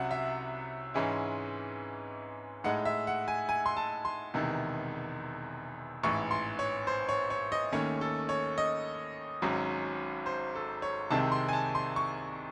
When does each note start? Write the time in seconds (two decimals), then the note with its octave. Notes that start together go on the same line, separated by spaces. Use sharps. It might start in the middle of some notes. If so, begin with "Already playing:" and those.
Already playing: C2 C3 F#3 C#4 F#5
0.11 E5
0.94 G#2 E3 G#3 C#4 E4
2.64 A2 G#3 D#4 F#5
2.85 E5
3.07 F#5
3.28 G#5
3.49 G#5
3.66 C6
3.77 A5
4.05 C6
4.34 E1 E2 C3 D#3
6.04 A1 G#2 E3 C#6
6.31 C6
6.59 C#5
6.87 C5
7.09 C#5
7.30 C#5
7.52 D#5
7.72 D#2 D#3 A3 C#4 C#5
8.01 A4
8.29 C#5
8.58 D#5
9.42 G#1 G#2 F#3 C#4
10.26 C5
10.55 A4
10.82 C#5
11.11 C2 C3 D#3 G#3 C4 A5
11.32 C6
11.48 G#5
11.53 A5
11.75 C6
11.96 C#6